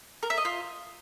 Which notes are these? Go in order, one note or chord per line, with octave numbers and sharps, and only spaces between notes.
A#4
E5
D#5
F4